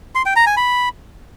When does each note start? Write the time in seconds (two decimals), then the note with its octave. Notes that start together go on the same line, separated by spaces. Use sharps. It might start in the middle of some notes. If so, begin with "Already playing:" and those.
0.15 C6
0.26 G5
0.36 A#5
0.46 G#5
0.57 B5